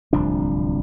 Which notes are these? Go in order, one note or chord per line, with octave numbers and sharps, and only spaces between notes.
D1 C2 F3 D4